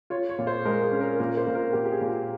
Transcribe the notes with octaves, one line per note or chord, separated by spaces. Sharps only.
F4 C#5
C#5
A#2
C5
G#3 A#4
G#4
C#4
A#4
A#2 A#4
C5
A#2
A#4
A#2 G4
G4
G#4
A#2
G4